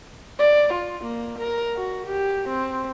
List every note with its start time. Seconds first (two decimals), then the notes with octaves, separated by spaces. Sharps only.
0.39 D5
0.73 F4
1.04 A#3
1.39 A#4
1.76 F#4
2.06 G4
2.48 C4